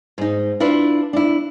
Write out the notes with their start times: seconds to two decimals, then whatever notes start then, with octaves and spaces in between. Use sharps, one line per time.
0.18 G#2 D#4
0.60 D4 E4 F4 B4
1.13 D4 E4